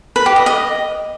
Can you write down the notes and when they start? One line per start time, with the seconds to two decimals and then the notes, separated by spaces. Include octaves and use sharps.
0.16 B4
0.26 G4
0.36 D#5
0.46 D#5